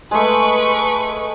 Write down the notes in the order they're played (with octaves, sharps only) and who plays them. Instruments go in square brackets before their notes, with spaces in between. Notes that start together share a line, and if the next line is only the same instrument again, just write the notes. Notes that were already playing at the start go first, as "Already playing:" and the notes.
[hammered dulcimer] G#3 A3 [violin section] B4 C#6